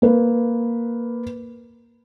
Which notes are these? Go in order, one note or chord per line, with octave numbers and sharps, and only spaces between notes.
A#3 B4